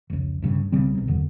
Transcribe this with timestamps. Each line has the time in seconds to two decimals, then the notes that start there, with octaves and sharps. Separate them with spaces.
0.10 F1 C#2
0.42 D2 G2 C#3
0.72 C2 C#3 G3 C4
0.95 B1 C3
1.08 F#1 E2 D3